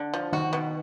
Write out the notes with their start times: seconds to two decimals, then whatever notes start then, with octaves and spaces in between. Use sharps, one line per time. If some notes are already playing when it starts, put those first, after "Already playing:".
Already playing: D3
0.14 F3
0.32 D#3 F#4
0.53 B2